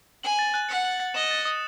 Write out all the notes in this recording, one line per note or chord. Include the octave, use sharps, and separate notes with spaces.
G#5 F#7
A6
F#6
F#5 C#7
F#7
A6
D#5 E7
A6
D#6